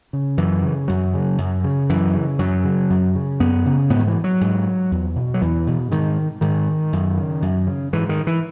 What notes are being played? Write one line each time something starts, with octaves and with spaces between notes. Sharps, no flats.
C#3
F#2 E3
C#3
F#2 F#3
C#3
F#2
C#3
F#2 E3
C#3
F#2 F#3
C#3
F#2
C#3
F#2 B3
C#3
G#2 B3
D#3
E3
F#3
G#2
E2
B2
F#3
E2 E3
B2
G#2 D#3
G#2 D#3
F#2
C#3
F#2
C#3
G#2 E3
D#3
E3